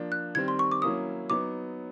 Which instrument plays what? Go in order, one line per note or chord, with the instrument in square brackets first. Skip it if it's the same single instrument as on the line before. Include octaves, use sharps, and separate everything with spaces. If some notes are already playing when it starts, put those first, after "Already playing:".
Already playing: [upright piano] F3 A#3 D4
[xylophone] F#6
[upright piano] D#3 G3 C4 [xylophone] G#6
[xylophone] C6
C#6
D6
[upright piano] F#3 A#3 C#4 E4 [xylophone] D#6
[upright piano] F#3 B3 D#4 [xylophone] D6